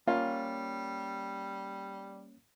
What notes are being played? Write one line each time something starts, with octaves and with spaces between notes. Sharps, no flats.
G3 A#3 C#4 F4 C#5